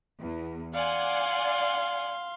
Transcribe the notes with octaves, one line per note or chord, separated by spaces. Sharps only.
E2
D5 F5 F#5 G#5 C6